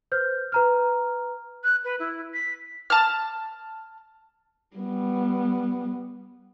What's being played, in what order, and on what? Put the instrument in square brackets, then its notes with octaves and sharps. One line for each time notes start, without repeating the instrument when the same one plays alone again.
[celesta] B4 C5 F6 G6
B4 A#5 F6
[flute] F#6
B4
E4
B6
[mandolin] A5 F6
[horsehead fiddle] G3 B3